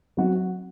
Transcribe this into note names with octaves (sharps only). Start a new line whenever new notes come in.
F#3 C4 F#4